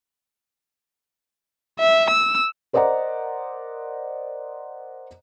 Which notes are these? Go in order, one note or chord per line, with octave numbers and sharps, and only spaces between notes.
E5
E6
A#4 C5 D5 D#5 F#5 A#5